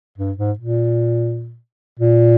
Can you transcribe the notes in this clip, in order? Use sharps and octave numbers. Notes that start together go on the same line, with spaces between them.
G2
G#2
A#2
A#2